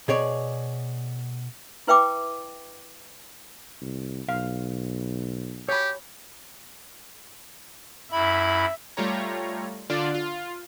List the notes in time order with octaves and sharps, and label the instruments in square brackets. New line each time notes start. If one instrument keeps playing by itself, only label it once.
[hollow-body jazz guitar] B2 G#4 C#5 D5
[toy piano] E4 B4 E5 G5 D6
[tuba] C2
[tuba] B1 [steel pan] F5
[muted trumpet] G4 [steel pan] C#5 B5
[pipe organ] F#2 E4 B5 [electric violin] E5
[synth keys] G3 A3 F4 G4 C#5 A#5
D3 D4 F4 D5
F4